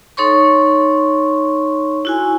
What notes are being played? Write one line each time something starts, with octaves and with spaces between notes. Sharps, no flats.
D#4 A4 C#5 C6 C#6
E4 F#4 G#5